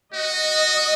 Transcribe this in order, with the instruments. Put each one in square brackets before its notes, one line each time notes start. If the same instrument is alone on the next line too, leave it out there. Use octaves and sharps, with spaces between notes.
[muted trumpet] F#4 [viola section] D#5